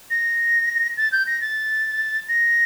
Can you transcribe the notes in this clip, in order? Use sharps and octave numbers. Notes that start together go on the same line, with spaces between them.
A#6
A6
G6
A#6
A6
A#6